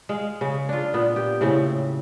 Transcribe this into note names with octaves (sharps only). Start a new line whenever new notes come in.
G#3 F5
C#3
D4 F4
A#2 B3
G4
A2 C#3 C4